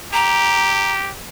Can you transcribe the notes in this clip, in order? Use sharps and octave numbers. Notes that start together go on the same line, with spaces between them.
G4 A#5